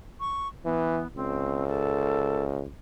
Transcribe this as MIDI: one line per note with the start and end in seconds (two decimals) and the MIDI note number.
0.20 0.48 85
0.65 1.02 52
0.65 1.07 59
1.16 2.65 37
1.16 1.64 60
1.68 2.44 69